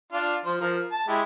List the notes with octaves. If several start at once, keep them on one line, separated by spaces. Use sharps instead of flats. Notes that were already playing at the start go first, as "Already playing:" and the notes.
D4 F4
F3 C5
F3 A#4
A5
G#3 E4 G4